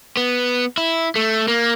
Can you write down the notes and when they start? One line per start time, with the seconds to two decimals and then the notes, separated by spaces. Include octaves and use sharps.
0.17 B3
0.78 E4
1.16 A3
1.48 A#3